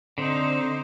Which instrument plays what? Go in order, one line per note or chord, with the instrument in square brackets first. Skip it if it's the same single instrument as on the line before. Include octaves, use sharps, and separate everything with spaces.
[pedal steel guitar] D3 C4 [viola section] D#4 C5